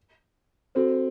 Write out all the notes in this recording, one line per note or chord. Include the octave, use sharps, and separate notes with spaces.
C4 F#4 A4 C5